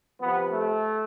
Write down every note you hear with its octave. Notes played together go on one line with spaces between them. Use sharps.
C3 F3 B3
A3